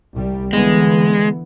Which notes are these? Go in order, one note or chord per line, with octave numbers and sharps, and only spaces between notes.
C2 G3
D3 E3 G#3 B3